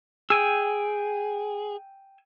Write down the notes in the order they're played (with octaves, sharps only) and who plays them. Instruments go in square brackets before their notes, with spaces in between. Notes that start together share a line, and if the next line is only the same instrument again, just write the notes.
[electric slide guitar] G#4 [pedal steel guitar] G5 G#5 E6